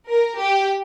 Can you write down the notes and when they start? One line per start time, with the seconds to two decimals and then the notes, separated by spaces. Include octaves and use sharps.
0.08 A#4
0.38 G4